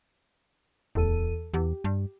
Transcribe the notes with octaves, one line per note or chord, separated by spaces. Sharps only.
D1 E2 A4 D#7
E2 G4
G2